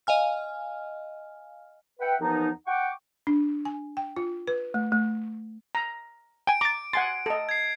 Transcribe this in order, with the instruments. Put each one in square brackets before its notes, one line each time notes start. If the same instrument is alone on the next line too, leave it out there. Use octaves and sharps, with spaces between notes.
[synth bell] D#5 F5 G#5 F6
[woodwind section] B4 E5 F#5 G5
D#2 E3 F3 B3 D#4
F#5 G5 C#6 D6
[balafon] D4
G#5
G5
F4
B4
A3
A3
[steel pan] A#5
[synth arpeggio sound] G5 G#5 [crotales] D7
[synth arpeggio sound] A#5 A6 [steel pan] D6
[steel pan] F#5 G#5 C6 [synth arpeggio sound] A6
[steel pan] A4 D#5
[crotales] G#6 C7